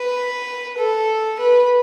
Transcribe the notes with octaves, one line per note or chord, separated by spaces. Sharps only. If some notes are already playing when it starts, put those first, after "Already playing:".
Already playing: B4
A4
B4